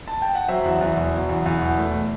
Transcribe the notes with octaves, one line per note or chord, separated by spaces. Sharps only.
A5
G5
F#5
F#3 C5 E5
E2
E2
B2
F#3
E2
E2
B2
A3